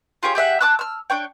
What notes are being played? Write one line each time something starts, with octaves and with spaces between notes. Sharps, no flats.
F4 G4 G#4 C#5
G4 G#4 E5 F#5
A5 D6 E6 F#6
E6 F6
D4 C#5 G5